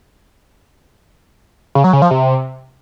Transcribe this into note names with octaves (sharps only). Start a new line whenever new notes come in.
C#3
F#3
C#3
F3
C3